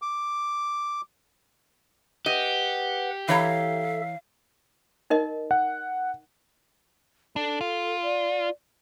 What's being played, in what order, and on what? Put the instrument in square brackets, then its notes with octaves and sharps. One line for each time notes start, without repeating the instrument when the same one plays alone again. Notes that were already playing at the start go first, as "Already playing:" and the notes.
[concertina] D6
[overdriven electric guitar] G4 [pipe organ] B4 F#5 [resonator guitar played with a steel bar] D#5
[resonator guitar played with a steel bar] E3 C#5 A#5 [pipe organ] A4 E5 [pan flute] F5
[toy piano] D#4 A#4 D#5
[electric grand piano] F#5
[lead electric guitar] D4 [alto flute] A4
[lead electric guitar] F4
[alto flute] D5